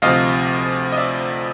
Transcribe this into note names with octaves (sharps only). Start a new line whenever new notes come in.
D2 C3 F3 D#5 F5
D#5
D5 E5